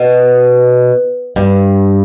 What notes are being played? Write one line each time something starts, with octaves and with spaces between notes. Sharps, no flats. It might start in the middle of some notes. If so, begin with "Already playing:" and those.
Already playing: B2
G2